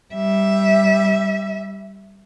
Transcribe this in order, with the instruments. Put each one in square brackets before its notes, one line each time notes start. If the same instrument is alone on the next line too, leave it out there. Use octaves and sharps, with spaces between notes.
[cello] G3 E5